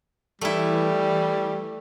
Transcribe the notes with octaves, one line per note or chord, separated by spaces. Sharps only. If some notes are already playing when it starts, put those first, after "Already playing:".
E3 G3 A3 E4